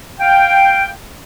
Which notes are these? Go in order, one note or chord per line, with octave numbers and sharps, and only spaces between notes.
F5 G5